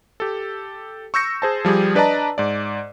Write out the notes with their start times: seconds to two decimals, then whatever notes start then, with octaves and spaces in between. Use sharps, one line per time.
0.20 G4 A4
1.14 C#6 E6 G6 A#6 C#7
1.42 G#4 C5 A5
1.65 F3 G3 G4 G#4
1.95 D4 B4 D5 D#5 A5 A#5
2.38 G#2 D5